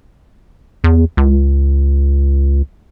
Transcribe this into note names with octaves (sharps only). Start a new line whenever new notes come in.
E2
C#2